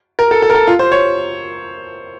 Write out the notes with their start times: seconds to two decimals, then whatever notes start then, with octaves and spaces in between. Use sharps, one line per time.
0.19 A#4
0.31 A4
0.42 A4
0.50 A#4
0.55 A4
0.67 F4
0.79 C5
0.92 C#5